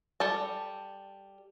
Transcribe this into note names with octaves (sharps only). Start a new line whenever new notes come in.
G3 A4 A5